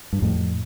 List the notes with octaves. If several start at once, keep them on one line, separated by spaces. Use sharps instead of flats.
G2
F2 A2